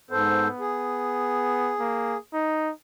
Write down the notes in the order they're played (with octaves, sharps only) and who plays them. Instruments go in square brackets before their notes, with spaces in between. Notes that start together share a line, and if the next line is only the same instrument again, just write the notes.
[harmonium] G#2 A4 C5 [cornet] B3
[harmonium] G#4
[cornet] A#3
D#4